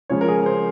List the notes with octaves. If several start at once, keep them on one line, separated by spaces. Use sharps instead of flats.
C#3 F3 G#3 C#4 C#5
A#4
G#4
C5